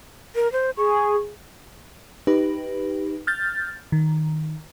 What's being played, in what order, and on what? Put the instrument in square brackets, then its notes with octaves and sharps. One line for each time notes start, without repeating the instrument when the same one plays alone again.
[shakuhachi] A#4
C5
[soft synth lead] G#4 [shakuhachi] C#6
[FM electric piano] D#4 G4 B4
F6 G6 A6
D#3